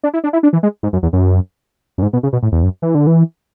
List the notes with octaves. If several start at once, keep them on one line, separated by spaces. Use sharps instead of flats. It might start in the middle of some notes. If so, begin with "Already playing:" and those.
D4
E4
D4
E4
D4
E3
G#3
G#2
F#2
E2
F#2
F#2
G#2
B2
C#3
B2
A2
E2
F#2
E3
D3
E3